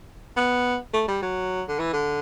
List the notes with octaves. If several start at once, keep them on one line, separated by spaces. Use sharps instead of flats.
B3
A3
G3
F#3
D3
E3
D3